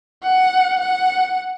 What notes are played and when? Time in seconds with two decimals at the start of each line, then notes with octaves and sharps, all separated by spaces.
0.24 F#5
0.80 F#5